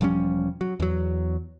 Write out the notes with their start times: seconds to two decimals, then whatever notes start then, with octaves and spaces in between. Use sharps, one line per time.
0.01 E1 F3 G3 C#4
0.61 F#3
0.80 E2 F#3